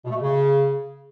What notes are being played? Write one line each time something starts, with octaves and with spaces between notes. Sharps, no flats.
B2
A3
B2
C#3